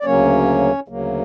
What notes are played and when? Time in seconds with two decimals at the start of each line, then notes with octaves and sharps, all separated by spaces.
0.01 D5
0.05 D2 C#3 F#3 A#3 C#4 C#5
0.88 D2 C#3 F#3 A#3